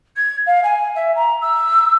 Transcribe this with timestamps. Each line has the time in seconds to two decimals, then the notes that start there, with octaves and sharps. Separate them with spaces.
0.16 G#6
0.46 F5
0.63 G#5
0.95 E5
1.15 A#5
1.41 E6